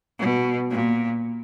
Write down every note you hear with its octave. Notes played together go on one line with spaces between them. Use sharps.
B2
A#2